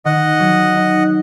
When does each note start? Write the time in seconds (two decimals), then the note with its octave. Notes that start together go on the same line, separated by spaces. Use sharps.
0.05 D#3 D#5 F#5
0.40 F#3
0.75 D#4